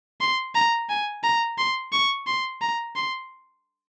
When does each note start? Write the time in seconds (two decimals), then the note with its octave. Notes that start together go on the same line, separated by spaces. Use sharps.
0.21 C6
0.55 A#5
0.89 G#5
1.23 A#5
1.58 C6
1.93 C#6
2.27 C6
2.61 A#5
2.96 C6